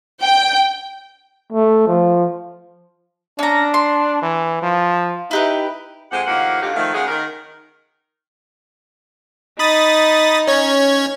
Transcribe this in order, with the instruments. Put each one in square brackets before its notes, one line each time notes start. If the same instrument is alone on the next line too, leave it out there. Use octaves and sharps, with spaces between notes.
[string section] G5
[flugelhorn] A3
F3
[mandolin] C#4 A#5 [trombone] D4
[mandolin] C6
[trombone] E3
F3
[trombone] D#4 [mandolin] E4 G4 B4
[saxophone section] F2 G#3 G4 C5 F#5
A2 D#3 F3 A#3 G4 F#5
D3 F#3 D4 D#4 F4 G4
D#3 F3 A3
C#3 F#3 G#3 G#4 F#5
D#3 A#4
[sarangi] D#4 [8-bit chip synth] B5 D#6 A6
[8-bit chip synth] C#4 C#5 G#6